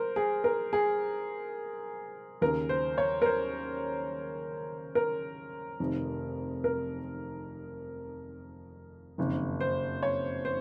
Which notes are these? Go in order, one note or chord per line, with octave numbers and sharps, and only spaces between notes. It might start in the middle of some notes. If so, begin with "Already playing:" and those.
Already playing: A#4 C5
G#4
A#4
G#4
D#2 C#3 A#4
C5
C#5
A#4
C5
A#4
F1 F2 D#3
A#4
F#1 F2 D#3
C5
C#5
C5